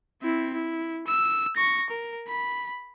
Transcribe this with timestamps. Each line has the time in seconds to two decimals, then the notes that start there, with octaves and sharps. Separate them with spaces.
0.22 C4 E4
0.54 E4
1.07 E6
1.57 C#6 A#6
1.90 A#4
2.28 B5